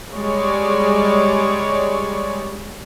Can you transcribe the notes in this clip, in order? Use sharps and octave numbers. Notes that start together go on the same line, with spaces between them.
G3 G#3 C#5 D5